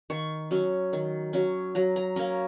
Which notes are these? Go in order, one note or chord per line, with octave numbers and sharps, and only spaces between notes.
D#3 C#6
F#3 C#4
D#3
F#3 C#4
F#3 A#5
A#5
A#3 C#4 A#5